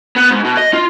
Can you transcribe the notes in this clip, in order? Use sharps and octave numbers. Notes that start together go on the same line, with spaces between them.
B3
G#2
B2
D#5
F4